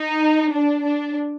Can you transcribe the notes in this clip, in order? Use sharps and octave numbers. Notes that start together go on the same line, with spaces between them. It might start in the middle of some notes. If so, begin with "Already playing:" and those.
Already playing: D#4
D4
D4